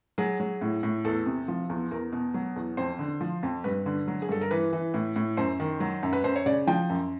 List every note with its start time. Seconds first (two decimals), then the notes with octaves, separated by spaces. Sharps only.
0.18 F#3 G#4
0.40 F#3
0.61 A2
0.83 A2
1.05 E2 A4
1.26 C3
1.48 F3
1.70 E2
1.91 E2 A#4
2.12 B2
2.34 F#3
2.56 E2
2.77 F2 C5
2.99 D3
3.21 F3
3.43 F2
3.64 G2 B4
3.86 D3
4.08 F#3
4.22 G#4
4.29 G2 A4
4.41 A#4
4.51 E3 B4
4.73 E3
4.94 A2
5.16 A2
5.37 F#2 C5
5.60 D#3
5.80 F#3
6.03 F#2
6.13 B4
6.24 F#2 C5
6.36 C#5
6.46 C#3 D5
6.67 F3 G5
6.90 F#2